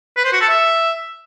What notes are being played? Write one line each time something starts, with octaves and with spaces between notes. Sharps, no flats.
B4
C5
F#4
A4
E5